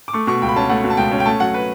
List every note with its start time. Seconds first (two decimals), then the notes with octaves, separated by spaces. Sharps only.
0.08 D6
0.14 A3 C#6
0.27 B2 C#6
0.42 C#2 G5
0.49 B5
0.56 C#4 A5
0.69 A3 F#5
0.84 B2
0.90 A5
0.97 C#2 G5
1.12 C#4
1.20 G5
1.26 A3 A5
1.40 F#3 F#5
1.54 B4